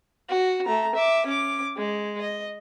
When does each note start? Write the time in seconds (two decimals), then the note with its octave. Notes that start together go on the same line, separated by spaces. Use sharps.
0.29 F#4
0.65 A3 A#5
0.95 E5 D6
1.26 C#4 D6
1.77 G#3
2.20 D#5